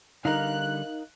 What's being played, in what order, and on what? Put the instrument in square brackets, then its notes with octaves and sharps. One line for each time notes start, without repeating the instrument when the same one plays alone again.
[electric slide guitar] D3 G3 [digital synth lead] D#4 [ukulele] A#4 F5 [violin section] F#6